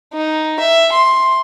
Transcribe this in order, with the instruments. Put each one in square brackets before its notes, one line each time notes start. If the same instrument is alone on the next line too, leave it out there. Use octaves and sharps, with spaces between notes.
[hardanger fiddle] D#4
E5
C6